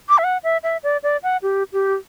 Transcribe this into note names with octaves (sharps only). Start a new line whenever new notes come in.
D6
E5
F#5
E5
E5
D5
D5
F#5
G4
G4